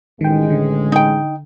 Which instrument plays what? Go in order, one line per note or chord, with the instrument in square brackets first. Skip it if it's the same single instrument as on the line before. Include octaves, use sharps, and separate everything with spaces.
[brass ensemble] A1 G#3 [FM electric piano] D#3 G5
[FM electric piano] D3
[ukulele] D#4 G5